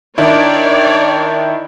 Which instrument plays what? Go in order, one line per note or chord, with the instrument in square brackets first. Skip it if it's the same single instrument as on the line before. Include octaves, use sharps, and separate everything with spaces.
[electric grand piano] D#3 D4 E4 [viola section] C#5 D5